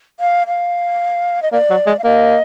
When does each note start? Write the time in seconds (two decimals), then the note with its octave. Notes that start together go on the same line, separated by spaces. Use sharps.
0.20 F5
0.47 F5
1.42 D#5
1.52 A#3 D5
1.70 F#3
1.87 G#3
1.99 F5
2.04 A#3 D#5